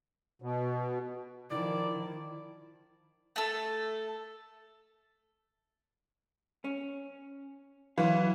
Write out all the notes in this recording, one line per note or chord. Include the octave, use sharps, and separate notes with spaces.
B2
D#3 F3 E4 D5
A3 A4
C#4
E3 F#3 F5